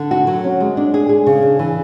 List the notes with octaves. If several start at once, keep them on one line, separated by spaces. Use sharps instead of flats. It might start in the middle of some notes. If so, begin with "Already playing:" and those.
Already playing: D3
F#4
F#3
C#4
G#3
D4
G#4
G#4
C#3
D4
E3